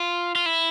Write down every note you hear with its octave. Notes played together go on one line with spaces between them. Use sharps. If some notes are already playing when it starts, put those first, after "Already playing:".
Already playing: F4
F4
E4